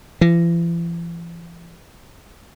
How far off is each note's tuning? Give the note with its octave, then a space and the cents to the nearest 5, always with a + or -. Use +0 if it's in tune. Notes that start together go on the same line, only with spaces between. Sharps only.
E3 +45